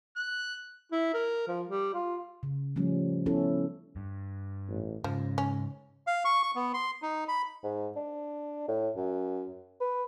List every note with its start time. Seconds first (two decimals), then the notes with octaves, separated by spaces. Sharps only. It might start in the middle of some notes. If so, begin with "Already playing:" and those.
0.16 F#6
0.92 E4
1.14 A#4
1.48 F3
1.68 G3
1.94 F4
2.43 C#3
2.76 F3 G3 A3 C#4
3.26 B3 C#4 E4 A4
3.96 G2
4.69 A1
5.04 G#2 C#3 F3
5.38 C#4
6.07 F5
6.25 C#6
6.43 C#6
6.55 B3
6.74 C6
7.02 D#4
7.28 B5
7.64 G#2
7.96 D4
8.68 A2
8.96 F#2
9.81 B4